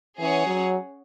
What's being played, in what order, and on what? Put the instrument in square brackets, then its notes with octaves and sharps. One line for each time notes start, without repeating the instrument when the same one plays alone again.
[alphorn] E3 [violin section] C#4 G#4 C#5 F#5
[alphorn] F#3